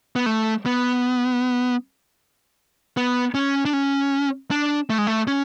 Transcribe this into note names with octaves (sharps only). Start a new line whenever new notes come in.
B3
A3
B3
B3
C#4
D4
C#4
D4
A3
G#3
A3
C#4